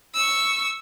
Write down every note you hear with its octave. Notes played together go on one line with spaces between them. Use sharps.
C#6 E6